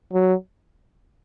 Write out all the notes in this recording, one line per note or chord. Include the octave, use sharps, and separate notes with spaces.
F#3